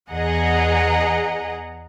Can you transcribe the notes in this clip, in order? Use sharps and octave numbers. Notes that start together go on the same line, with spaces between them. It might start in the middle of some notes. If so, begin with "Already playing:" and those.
E2 G#4 D#5 F#5 A#5